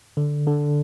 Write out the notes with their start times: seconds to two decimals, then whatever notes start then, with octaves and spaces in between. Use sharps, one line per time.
0.17 D3
0.47 D3